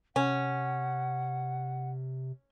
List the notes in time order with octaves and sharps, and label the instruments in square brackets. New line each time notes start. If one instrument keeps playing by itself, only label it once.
[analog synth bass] C3 [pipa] C#4 [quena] F#5